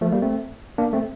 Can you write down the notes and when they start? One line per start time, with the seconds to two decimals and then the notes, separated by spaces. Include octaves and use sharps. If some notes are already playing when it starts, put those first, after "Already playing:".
0.01 F3 A3
0.12 G3 A#3
0.22 A3 C4
0.78 A#3 D4
0.93 A3 C4